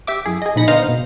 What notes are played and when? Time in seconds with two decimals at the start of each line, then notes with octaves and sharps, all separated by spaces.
0.07 G4 E5 D6
0.26 F#2 E4 G#4
0.42 G#4 D#5
0.56 A#2 F3 D#4 B5 A#6 C#7
0.68 D3 B3 C5 D#5 F5 A#5
0.88 B2